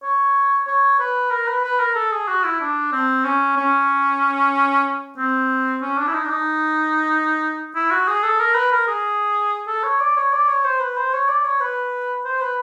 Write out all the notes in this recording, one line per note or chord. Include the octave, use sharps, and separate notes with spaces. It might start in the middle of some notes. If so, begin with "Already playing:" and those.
C#5
C#5
B4
A#4
B4
B4
A#4
A4
G#4
F#4
E4
D4
C4
C#4
C#4
C4
C#4
D4
E4
D#4
D4
D#4
E4
F#4
G#4
A4
A#4
B4
A#4
G#4
A4
C#5
D5
C#5
D5
C#5
C5
B4
C5
C#5
D5
C#5
B4
C5
B4